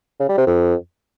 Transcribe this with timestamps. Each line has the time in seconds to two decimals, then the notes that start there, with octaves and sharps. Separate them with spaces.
0.20 C#3
0.29 G3
0.38 C3
0.47 F2